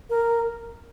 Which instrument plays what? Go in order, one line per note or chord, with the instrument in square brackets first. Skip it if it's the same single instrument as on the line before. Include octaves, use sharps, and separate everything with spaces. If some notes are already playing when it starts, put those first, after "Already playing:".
[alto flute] A#4